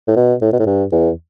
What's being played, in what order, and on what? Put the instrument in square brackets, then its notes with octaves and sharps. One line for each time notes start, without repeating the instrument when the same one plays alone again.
[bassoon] A2
B2
A2
B2
A2
G2
E2